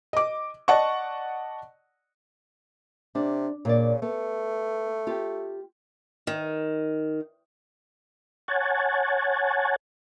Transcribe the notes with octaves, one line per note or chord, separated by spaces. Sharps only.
D#5 D6
D5 D#5 F#5 A5 C#6
C3 D4
A#2 C#3 D5
A3 B3
F4 G4
D#3
C#5 F#5 G#5 A5